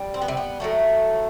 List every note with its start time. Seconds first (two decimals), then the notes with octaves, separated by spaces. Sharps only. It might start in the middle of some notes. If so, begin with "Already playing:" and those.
Already playing: G3
0.14 C4
0.22 B3
0.28 C3 C4
0.37 B3
0.60 A2 F#3 A3